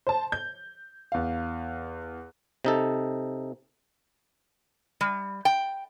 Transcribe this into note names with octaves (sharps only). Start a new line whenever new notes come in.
C5 A5
G6
E2 F5
C3 D#4 A4
G3
G5